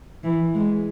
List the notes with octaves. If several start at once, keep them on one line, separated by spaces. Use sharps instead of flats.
E3
G#3